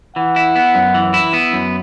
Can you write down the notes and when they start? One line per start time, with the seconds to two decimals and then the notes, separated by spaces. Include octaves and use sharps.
0.16 E3 F#5
0.36 E4
0.56 B3
0.75 F#2
0.94 E3
1.14 E4
1.33 B3
1.53 F#2